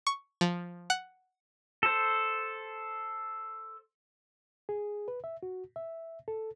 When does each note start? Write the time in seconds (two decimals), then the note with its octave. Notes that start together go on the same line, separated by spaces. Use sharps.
0.07 C#6
0.41 F3
0.90 F#5
1.83 A4 C5
4.69 G#4
5.08 B4
5.24 E5
5.43 F#4
5.76 E5
6.28 A4